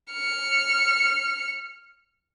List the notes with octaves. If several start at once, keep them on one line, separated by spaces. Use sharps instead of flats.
F6 C#7